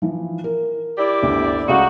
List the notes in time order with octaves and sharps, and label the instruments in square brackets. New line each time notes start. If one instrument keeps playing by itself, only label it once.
[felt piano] E3 F3
A#4
[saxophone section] E4 G4 D5
[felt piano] G1 D2
[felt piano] C#2 F5 D6 [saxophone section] A3 D#4 F#4